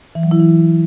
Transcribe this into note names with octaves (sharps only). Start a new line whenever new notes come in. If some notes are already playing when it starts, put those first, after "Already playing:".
E3
F#3
E4
E3